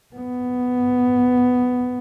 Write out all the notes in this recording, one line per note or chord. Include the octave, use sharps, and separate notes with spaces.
B3